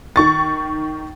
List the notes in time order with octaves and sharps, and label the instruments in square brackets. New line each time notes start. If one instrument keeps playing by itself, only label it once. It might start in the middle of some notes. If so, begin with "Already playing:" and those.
[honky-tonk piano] D#3 C#6 A6